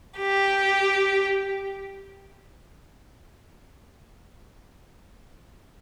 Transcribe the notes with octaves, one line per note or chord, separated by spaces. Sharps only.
G4